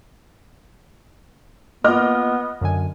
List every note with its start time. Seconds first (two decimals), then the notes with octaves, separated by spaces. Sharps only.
1.84 A#3 B3 F4 D#5 D6 F6
2.61 F#2 D3 G#5